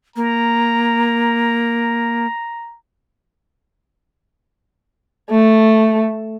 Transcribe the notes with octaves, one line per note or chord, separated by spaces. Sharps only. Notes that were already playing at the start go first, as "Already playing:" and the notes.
A#3 A#5
A3